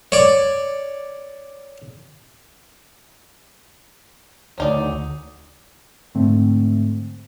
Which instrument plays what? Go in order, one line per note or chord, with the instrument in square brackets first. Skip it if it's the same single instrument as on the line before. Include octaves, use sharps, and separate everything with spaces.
[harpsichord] C#5 D5
[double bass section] D2 [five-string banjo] F#3 D#4 D5
[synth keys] G#2 D3 A3 C4